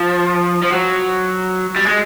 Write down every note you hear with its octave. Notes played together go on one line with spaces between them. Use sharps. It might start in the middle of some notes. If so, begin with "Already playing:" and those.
Already playing: F3
F3
F#3
G3
G#3